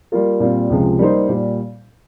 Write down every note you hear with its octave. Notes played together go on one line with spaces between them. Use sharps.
G3 A#3 F4 A#4
A#2 G3 C4 F4
C#2 C3 F3 G#3
G3 A#3 D#4 G4 C5
A#2 G3